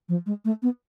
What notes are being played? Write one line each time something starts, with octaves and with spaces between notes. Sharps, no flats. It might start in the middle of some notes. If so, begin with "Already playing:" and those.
F3
G#3
A3
B3